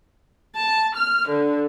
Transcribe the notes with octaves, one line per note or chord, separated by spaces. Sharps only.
A5
F6
D3